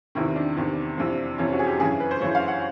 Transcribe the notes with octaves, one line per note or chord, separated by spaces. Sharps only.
E2 C3 D#3 E4
D4
E2 C3 D#3
F2 C3 E3
F2 C3 E3 C#4
F#4
G#4
G4
F#2 C#3 E3 G#4
B4
C5
F#2 C#3 E3 C#5
F5
F#5